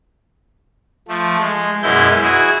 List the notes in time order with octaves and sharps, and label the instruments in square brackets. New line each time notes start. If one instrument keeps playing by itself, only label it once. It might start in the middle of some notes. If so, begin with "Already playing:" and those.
[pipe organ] F3 A3
G#3
F#2 B2 G#3 E4 G6
E4 F#4 G#4